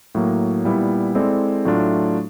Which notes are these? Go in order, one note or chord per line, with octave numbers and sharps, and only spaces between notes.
A2 F#3 A#3
A#2 G3 B3 E4
G#3 C4 E4 A4 D5
A2 F#3 A3 D4 F4